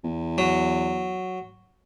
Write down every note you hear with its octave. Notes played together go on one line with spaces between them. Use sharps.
E2
F#3